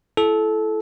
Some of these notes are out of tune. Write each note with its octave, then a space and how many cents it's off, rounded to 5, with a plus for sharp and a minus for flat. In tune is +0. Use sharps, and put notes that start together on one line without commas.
E4 +20 A4 -20